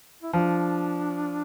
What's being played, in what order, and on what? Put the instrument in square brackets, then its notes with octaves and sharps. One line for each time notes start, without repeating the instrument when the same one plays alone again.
[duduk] E4
[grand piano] F3 [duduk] D4